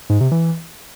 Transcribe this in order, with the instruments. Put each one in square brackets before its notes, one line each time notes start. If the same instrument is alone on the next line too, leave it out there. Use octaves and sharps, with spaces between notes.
[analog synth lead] G#2
C3
E3